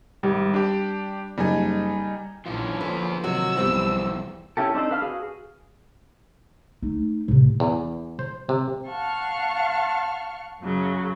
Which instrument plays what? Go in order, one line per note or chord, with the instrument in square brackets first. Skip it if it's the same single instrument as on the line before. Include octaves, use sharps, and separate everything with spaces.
[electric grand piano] G#1 [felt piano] G3
[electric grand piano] D4 G4
[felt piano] F#1 [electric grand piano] G3 D#4 G#5
[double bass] A#1 [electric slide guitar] E3 F4 [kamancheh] C#4 D4
[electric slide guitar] E2 B4 [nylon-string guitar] D3 [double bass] F3 A#3
[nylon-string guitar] C3 D#3 F#3 [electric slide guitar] F#4 [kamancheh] E6
[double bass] B1 [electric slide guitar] F2 E3 [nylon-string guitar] G3 B3 C4
[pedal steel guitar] C#4 E4 G4 A4
C4 D4 D#4 A4 C5
B4 F5 F6
F#4 G#4
[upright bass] A3 D#4
A2 C3
[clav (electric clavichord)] E2
C5
C3
[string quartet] F5 F#5 A5 C#6 F6
F#2 C#3 F#3